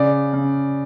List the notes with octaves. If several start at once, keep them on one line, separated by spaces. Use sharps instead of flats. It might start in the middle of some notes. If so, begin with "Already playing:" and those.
Already playing: C#3 D5
C#3